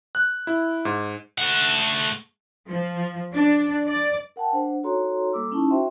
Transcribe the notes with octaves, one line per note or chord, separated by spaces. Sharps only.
F#6
E4
G#2
A3 F#5
F3
D4
D5
A#4 F#5 G5 A5
D4 C5 F#5
D#4 F#4 A4 C#5 A#5 C6
G3 A#3 A4 D6 E6
C#4 D#4 E4 A5 C#6
F#4 C5 E5 G5 C6 C#6